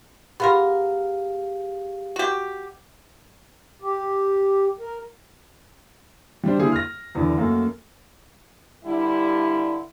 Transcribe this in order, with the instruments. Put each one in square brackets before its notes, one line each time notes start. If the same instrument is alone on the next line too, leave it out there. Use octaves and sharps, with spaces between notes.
[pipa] B3 F4 A#4 [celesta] G4 G#4 F5
[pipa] F#4 G4
[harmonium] G4
A#4
[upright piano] G3 D4 C5
D3 A#3 E4 G#4
F6 A#6
E2 D3
F#2 A3 A#3 F#4
[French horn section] G2 D3 G3 E4